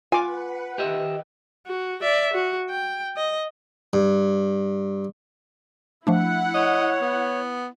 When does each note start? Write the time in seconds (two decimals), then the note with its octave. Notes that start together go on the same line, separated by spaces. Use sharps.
0.12 F4 B4 F#5 G#5 D6
0.78 D#3 G4 D#5 E5
1.66 F#4
2.02 D5 E5
2.33 F#4
2.70 G5
3.16 D#5
3.93 G2
6.07 F3 A3 D4 E4 F#5
6.54 C#5 D#5
7.02 B3